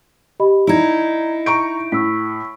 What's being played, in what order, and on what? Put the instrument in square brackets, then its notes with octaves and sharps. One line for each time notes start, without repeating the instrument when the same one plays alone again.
[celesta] G4 D#5 B5
[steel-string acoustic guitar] D#4 E4 [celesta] D5 A#5 G#6
[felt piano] A#5 C#6 D7 [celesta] G6
[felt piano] A2 [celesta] C#6 E6 B6